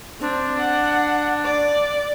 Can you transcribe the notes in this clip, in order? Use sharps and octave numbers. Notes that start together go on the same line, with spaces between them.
C4 D4
F#5
D5